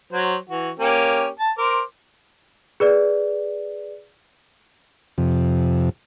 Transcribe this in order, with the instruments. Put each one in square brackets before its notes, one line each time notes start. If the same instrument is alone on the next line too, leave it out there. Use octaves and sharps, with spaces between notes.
[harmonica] F#3 C5
E3 F#4
A#3 C#4 G4
A5
A#4 C5 D6
[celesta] G#4 B4 D5
[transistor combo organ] F2 C3